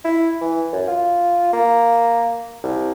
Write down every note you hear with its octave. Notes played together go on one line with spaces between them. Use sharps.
E4
E3
F#2
F4
A#3
C2